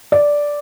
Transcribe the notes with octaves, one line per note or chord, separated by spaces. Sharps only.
D5